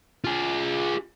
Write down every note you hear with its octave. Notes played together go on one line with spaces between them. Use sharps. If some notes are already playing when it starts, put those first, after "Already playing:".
F4 G#4